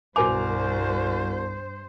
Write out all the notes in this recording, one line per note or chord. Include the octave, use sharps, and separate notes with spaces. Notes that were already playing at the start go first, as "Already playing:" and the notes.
C2 G2 B2 A#4 C5 G#5 D6 F7